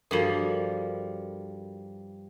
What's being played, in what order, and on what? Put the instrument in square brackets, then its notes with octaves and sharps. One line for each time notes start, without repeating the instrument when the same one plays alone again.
[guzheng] G2 F3 [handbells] F#4 A4 A#4